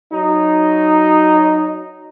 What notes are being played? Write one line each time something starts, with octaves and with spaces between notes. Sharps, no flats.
F#3 D#4